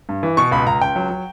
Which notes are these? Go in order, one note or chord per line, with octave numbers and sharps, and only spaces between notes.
G2
E3
B2 C#6
C#2 B5
C#2 A#5
C#2 G5
F#3
F#3